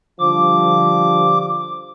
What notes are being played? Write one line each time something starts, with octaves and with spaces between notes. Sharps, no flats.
D3 F3 G3 D6